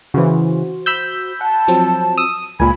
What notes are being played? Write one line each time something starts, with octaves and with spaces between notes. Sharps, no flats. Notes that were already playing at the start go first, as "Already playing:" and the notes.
C#3 E3 F#4 C5
B5 E6 G6
F#5 A5
F3 F#3 C4
D#6 E6
C#2 A#2 G#5 B5